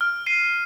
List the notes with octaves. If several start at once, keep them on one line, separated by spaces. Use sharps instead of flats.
F6
C7 D#7